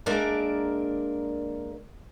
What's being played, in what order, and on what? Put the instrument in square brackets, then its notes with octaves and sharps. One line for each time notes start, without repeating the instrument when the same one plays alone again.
[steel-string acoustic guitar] G#3 A#3 D4 A#4 D5 E5